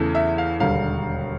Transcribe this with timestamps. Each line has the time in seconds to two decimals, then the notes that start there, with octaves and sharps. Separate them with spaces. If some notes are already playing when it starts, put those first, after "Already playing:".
Already playing: E2 C#3 E3 A3
0.15 E5
0.38 F5
0.60 E1 D#2 D3 G3 F5